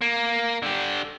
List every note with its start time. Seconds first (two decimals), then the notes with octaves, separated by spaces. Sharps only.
0.02 A#3
0.62 D3 G4